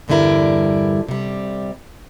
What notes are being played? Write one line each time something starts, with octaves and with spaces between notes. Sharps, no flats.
E2 G2 D3 G3 E4 A#4
C3 G3